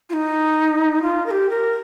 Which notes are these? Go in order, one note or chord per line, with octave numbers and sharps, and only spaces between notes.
F4
D#4
F4
A#4
G4
A#4